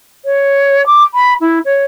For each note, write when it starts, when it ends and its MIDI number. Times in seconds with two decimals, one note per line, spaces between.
0.25 0.84 73
0.86 1.03 86
1.14 1.34 83
1.40 1.59 64
1.65 1.84 73